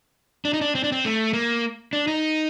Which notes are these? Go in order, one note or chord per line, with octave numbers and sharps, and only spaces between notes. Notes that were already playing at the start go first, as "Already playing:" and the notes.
D4
D#4
D4
C4
D4
C4
A3
A#3
D4
D#4